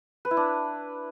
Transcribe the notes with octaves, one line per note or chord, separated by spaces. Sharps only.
B4
E4
D4